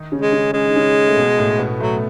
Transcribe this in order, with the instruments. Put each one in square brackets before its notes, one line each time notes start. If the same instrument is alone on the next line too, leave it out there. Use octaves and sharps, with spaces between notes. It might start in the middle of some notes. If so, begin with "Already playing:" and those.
Already playing: [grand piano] D#3 D#4
C#3 C#4
[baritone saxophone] G#3
[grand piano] C#3 C#4
[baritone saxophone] G#3 [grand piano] C#4
[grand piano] D#4
C#3 C#4
A3
B2 B3
A2 A3
B2 B3
[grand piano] A2 A3 [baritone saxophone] F#3